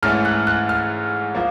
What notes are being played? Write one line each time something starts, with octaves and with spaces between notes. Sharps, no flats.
G#2 E3 A3 C#4 F6
F#6
F#6
F6
F3 A#3